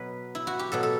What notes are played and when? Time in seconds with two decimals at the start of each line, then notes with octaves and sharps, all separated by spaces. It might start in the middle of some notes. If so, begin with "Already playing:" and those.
Already playing: B2 F#3 B4
0.35 E4
0.47 F#4
0.59 G4
0.72 B2 F#3 A4
0.83 A4